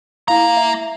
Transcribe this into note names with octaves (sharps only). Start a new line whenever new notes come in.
A#3 E4 F5 A#5
E5